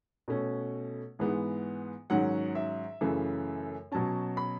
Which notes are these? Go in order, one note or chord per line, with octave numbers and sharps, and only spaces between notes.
B2 A3 C#4
G#2 E3 G#3 B3
G#2 D#3 F#3 C#4 F#5
E5
F#2 C#3 E3 A3
B2 F#3 C#4 A5
B5